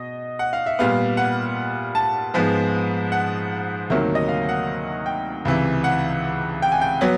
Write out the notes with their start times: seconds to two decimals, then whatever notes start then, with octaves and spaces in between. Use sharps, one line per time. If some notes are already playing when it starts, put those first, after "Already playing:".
Already playing: B2 D#5
0.39 F#5
0.53 F5
0.66 E5
0.79 A#2 G3 B3 F5
1.17 F#5
1.95 A5
2.34 G#2 F3 G#3 B3
3.12 F#5
3.90 D2 C3 D#3 F#3 A#3 E5
4.15 D#5
4.29 F5
4.49 F#5
5.06 G5
5.45 C#2 C3 E3
5.84 F#5
6.62 G5
6.72 G#5
6.81 G5
7.01 F#3 B3